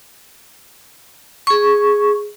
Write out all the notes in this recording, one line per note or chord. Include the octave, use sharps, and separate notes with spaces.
G#4 C#6